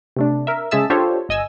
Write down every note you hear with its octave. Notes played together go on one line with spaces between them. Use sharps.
C3 A3 D4
A#4 E5
C#3 G#3 G#4 E5 A5 E6
D4 F4 G4 A4 C5 C#5
G1 D#5 G#5 E6